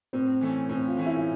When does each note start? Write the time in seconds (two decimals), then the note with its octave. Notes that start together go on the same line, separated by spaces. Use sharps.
0.13 A2 C4
0.41 E3 A3 C#4
0.69 A2 C4
0.88 F4
0.97 E3 A3 C#4
1.06 E4